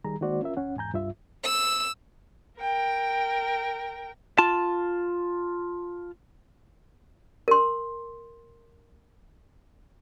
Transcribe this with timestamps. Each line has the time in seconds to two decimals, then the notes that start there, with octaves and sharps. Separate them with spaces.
0.05 D#3 G3 G#4 A#5
0.21 D#3 G#3 A#3 F#4 C5 D5
0.42 C#4 F4 A#4 E5
0.57 D2 C#4 F#5
0.76 E2 G#2 G#5 A#5 G6
0.93 C2 G2 F4 E5
1.44 E6
2.59 A#4 G5
4.38 F4 A5
7.48 A#4 C6